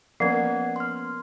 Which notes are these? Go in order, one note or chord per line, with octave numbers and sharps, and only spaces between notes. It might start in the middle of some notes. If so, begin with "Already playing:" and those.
F3 A#3 B3 C#4 F#5 G#6
C6 F6